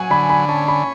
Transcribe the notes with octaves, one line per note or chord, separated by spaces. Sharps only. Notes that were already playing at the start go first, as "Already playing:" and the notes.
Already playing: F#3 G#5
D3 B5
B5
C#4 A5
B5